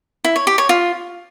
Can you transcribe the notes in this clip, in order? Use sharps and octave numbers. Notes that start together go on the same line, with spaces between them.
E4
C#5
G4
C#5
F4